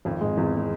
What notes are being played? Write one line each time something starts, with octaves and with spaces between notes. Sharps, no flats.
G#1 F2 F3
G#2 G#3
G#1 E2 E3
G#3